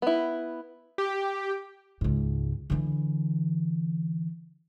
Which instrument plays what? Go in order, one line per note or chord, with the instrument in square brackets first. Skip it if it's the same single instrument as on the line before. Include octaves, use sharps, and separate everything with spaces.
[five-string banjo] B3 E4
[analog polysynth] G4
[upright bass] C#2 G#2
D3 E3